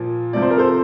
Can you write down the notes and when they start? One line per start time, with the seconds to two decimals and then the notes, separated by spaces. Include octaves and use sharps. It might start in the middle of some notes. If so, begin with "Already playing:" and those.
Already playing: A#2 F3
0.33 C3 F3 D5
0.42 C5
0.51 A#4
0.58 A4 C5